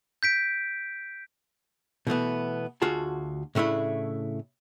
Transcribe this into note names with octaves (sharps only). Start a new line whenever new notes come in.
G6 B6 D7
B2 E3 A3 B3
D2 F4 F#4 G#4 A5
A2 C#3 A3 D4 E4